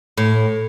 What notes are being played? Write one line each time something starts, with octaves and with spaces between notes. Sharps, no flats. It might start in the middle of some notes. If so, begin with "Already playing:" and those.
A2